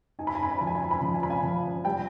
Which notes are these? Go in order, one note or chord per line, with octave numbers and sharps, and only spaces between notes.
D#4 G#5
B5
G#5
B5
G#5
F3 B5
G#5
B5
G#5
B5
F3 G#5
B5
G#5
B5
F5 G#5
F3
G3 G5